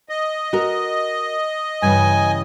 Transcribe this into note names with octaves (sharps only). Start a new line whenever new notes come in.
D#5
F#4 A#4
G2 C#3 E3 G#5